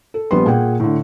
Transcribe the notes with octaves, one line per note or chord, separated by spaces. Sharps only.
A4
A#1 G3 B3 B4 C6
A#2 G#4 F#5 G5
A2 D3